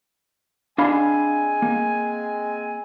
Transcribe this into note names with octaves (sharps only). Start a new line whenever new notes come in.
G#3 C4 D4 F5 G#5 B5
A#3